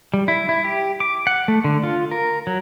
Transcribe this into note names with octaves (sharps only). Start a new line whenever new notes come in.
G3
E4
E4
G4
D6
F#5
A3
D3
F4
A#4
F#3